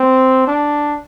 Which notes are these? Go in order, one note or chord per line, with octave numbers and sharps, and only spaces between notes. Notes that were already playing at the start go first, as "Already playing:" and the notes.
Already playing: C4
D4